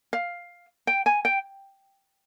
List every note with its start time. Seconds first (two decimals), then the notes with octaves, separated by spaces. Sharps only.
0.13 F5
0.87 G5
1.06 G#5
1.25 G5